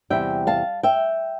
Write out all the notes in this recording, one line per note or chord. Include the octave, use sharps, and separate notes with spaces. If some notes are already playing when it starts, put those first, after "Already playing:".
E2 C3 G3 E5 G5
F5 A5
E5 G5